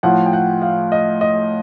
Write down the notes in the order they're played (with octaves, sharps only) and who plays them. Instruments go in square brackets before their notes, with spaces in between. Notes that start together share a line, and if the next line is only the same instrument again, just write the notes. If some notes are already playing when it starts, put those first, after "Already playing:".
[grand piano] A2 F3 F#5
G5
F#5
F5
D#5
D#5